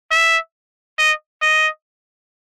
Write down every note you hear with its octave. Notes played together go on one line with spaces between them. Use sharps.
E5
D#5
D#5